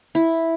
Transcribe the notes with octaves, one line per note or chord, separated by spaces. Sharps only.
E4